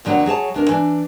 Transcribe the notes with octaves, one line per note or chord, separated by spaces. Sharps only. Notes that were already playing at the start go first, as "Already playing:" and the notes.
F2 D3 F#3 A#3 C#5 F#5
F#3 G#4 C#5 A5
D2 D4 A#4
E3 D4